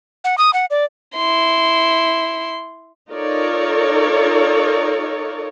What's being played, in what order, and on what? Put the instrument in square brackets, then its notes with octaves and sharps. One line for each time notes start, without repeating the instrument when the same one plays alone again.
[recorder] F#5
D#6
F#5
D5
[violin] E4 C6
[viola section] D#4 F4 A4 A#4 C#5 D5